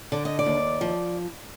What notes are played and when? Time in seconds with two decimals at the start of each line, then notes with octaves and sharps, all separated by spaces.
0.12 D3 D5
0.25 D#5
0.39 D5
0.46 D#2
0.81 F3